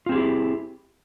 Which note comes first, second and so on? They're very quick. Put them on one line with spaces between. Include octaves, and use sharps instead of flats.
F4 C4 G#4 G4 E4